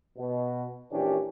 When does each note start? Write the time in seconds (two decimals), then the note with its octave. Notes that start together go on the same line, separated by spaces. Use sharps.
0.18 B2
0.91 A#1 A#2 E3 C#4 D4 G4